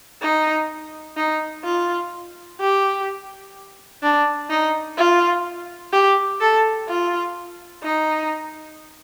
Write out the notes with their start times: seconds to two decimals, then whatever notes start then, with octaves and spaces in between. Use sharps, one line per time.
0.22 D#4
1.17 D#4
1.64 F4
2.60 G4
4.02 D4
4.50 D#4
4.98 F4
5.93 G4
6.41 A4
6.88 F4
7.83 D#4